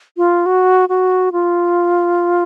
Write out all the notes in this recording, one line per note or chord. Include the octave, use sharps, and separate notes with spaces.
F4
F#4
F#4
F4